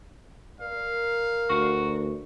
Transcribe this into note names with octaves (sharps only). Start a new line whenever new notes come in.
A#4 D5 F5
D2 F#4